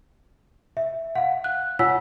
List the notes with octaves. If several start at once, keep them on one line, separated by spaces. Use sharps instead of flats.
E5
F5 F#5
F#6
F4 C#5 F#5 G#5 E6 B6